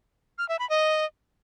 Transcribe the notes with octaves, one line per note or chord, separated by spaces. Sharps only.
F6
E5
B5
D#5